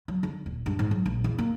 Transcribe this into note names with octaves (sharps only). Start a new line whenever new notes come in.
F#3
D3
D#1
G2
G#2
F#3
A#1
E2
A#3